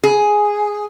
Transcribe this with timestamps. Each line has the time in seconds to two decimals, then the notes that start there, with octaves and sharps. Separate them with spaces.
0.04 G#4